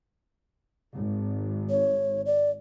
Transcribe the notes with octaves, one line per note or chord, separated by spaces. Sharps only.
G#1
C#5
D5